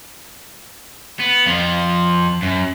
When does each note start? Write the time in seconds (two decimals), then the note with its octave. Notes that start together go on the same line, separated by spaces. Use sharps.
1.20 B3
1.46 F2 F3
2.42 F#2